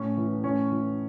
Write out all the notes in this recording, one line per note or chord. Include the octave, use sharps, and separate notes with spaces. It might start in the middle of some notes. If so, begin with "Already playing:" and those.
Already playing: A2 C#4
E3
A2 C#4
E3